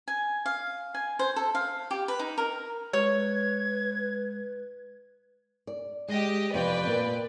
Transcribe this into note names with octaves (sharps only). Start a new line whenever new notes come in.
G#5
F5
G#5
C5
A4
F5
G4
B4
D#4
A#4
G#3 B4 C#5 G#6
D5
G#3 G4 D#5
F2 C3 E3 B4 D5 G5
A#2